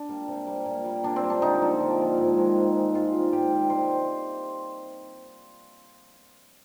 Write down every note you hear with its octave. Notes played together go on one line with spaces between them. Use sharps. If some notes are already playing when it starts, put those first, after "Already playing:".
Already playing: D4
G3 A#3
C3
G3 A#3
A#2
G3 A#3
A#2 D4
C4
G3 A#3
D4
D3 D#4
F3 A#3
D3
F3 A#3
G#2
D#3 G#3
G#2
D#3 G#3
G#2 F4
D#3 G3
G#2 G4
D#3 G3
C3 C5